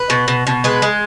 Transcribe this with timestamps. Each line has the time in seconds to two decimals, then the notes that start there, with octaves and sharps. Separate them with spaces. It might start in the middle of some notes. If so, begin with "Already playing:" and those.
Already playing: B4
0.10 B2
0.28 B2
0.47 B2
0.64 G#3 B4
0.82 G#3